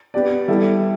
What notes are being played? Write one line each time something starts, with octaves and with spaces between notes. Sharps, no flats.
B3 G4 D5
G3 E4 A4 E5